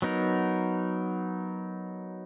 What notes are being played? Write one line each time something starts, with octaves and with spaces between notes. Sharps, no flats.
F#3 B3 D#4 A#4